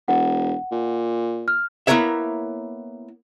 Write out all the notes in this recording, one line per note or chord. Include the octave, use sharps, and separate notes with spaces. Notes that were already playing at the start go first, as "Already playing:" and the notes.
E1 F#5
A#2
F6
A#3 B3 E4 A#4 C#5 E5